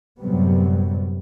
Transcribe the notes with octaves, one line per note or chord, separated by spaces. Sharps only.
F#2 A2 C3 F#3 G3 B3